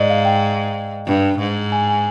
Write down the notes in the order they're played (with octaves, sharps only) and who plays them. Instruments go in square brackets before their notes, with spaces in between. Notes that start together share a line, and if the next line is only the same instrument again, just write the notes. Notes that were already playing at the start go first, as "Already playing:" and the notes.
Already playing: [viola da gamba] G#2 [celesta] D5 D#5
[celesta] F5
G5
[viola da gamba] G2
G#2
[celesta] G#5
G#5